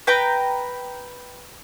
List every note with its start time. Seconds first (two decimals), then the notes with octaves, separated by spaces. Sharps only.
0.07 B4 G5 A#5 B5